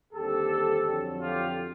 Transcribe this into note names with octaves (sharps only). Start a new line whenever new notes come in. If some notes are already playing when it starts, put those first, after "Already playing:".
D#2 D3 G3 C4 G4 A4
F2 D3 F#3
F4 G4